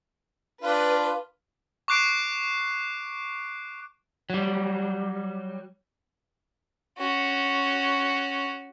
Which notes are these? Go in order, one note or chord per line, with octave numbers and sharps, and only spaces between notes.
D4 F4 B4
C#6 D6 F#6 C7 D7
F#3 G3
C#4 F#4